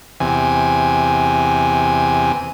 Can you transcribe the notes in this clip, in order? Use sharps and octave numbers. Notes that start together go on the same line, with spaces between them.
E2 C3 G#5